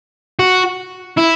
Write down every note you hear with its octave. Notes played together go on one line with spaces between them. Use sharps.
F#4
E4